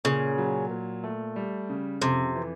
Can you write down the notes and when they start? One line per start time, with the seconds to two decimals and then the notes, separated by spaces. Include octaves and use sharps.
0.05 A#2 C#3
0.38 F#3
0.71 A#2
1.04 A3
1.36 G3
1.69 C#3
2.02 F2 C3
2.35 E3